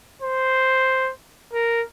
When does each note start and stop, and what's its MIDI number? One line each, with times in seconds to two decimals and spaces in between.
0.22 1.11 72
1.53 1.82 70